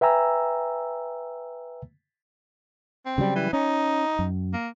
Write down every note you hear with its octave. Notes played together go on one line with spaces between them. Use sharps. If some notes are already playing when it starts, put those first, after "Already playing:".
B4 E5 G5 G#5 A#5 E6
C4
C#3 F#3 G3
E3
C#4 D#4
F#2
A#3